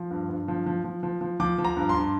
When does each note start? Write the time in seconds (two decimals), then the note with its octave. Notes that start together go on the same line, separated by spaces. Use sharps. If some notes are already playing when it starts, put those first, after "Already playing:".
Already playing: F3
0.11 G2
0.29 G2
0.48 F3
0.66 F3
0.84 F3
1.03 F3
1.21 F3
1.40 F3 D6
1.58 F3
1.65 A#5
1.77 G2
1.89 C6
1.94 G2